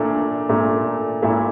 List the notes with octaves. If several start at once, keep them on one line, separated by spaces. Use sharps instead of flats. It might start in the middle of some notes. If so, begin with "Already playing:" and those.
Already playing: A#2 A3 D4
A#2 A3
A#2 A3 E4 E5